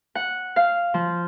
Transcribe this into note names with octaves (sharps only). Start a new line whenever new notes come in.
F#5
F5
F3